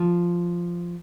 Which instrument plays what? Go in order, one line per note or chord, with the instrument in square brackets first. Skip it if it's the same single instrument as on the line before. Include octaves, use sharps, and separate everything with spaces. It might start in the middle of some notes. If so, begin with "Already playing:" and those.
Already playing: [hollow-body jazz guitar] F3